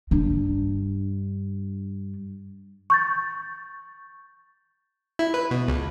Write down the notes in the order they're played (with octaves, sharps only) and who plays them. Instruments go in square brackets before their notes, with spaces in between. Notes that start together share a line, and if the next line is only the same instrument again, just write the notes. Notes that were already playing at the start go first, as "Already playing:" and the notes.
[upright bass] G2 D4
[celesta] C#6 G6 A6
[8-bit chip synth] E4
B4
B2
C#2